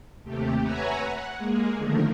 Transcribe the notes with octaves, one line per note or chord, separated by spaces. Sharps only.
D#2 C3 A3 G4
B4 C#5 E5 F#5 G#5 A#5
F#5
G#3 A#3 G#4
D3 D#3 F3 A3 A#4